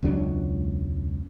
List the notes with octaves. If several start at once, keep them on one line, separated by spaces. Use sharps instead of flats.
E1 C#2 F#3 D4